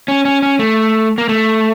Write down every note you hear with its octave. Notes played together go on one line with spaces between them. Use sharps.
C#4
C#4
C#4
A3
A#3
A3